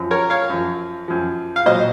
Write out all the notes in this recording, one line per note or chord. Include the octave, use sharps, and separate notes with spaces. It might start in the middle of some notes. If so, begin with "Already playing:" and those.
Already playing: F#2 F3
A#4 C#5
C#5 F5
F#2 F3
F#2 F3
F5
A#2 F#3 C5 D#5